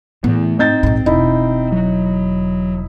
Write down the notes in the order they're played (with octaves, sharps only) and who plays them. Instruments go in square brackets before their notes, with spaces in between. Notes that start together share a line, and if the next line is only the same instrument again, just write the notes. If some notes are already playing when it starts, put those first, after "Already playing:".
[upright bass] A2 [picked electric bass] E3 B3
[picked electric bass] C4 [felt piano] D#4 G6 A6
[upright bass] A#1 G#2
[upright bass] E1 [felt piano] D#4 E4
[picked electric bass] F#3